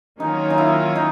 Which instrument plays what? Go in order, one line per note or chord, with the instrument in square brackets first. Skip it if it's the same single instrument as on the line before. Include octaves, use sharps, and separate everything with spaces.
[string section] D#3 F#3 A#3 C#4 F4 [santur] D#4
[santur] D#4
E4
D#4